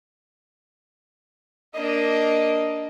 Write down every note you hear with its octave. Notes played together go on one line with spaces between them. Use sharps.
A#3 D4 D#5